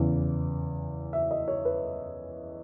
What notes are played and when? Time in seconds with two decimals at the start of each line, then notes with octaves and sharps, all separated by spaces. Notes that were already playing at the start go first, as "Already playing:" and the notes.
Already playing: E2 C#3 E3
1.13 E5
1.31 D#5
1.48 C#5
1.65 B4